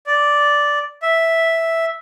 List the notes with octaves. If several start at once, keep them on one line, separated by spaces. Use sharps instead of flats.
D5
E5